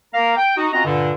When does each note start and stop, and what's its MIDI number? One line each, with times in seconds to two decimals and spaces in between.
0.14 0.35 58
0.14 0.35 70
0.14 0.35 77
0.14 0.35 82
0.37 0.55 79
0.57 0.68 63
0.57 0.68 66
0.73 0.85 60
0.73 0.85 61
0.73 0.85 65
0.73 0.85 66
0.73 0.85 75
0.73 0.85 82
0.85 1.11 43
0.85 1.11 46
0.85 1.11 50